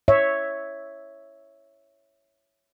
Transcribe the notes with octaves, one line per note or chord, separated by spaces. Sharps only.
C#5 E5